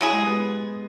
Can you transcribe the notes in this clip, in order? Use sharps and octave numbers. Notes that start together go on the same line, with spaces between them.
F#3 E4 G#4
G#3
B3